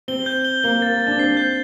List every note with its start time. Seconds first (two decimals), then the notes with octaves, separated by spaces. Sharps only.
0.08 C4 G7
0.26 G6
0.45 G7
0.63 A#3 G7
0.82 A6
1.00 A6
1.07 D4
1.18 C4 C7
1.37 G6